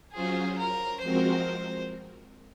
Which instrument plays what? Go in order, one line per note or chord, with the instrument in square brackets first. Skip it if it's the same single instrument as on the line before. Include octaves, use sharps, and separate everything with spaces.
[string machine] F#3 C#4 F4 C5 [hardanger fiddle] G#4
[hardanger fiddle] A#4
[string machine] F3 G#3 C4 F#4 A#4 [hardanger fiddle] C5